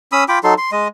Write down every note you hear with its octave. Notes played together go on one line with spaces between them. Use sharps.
C#4 B5 D#6 E6
F4 G5 B5 D6
F#3 D#4 A4 C6
C6
G#3 D#5